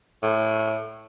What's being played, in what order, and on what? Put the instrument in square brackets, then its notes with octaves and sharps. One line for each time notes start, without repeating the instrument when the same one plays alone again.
[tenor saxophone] A2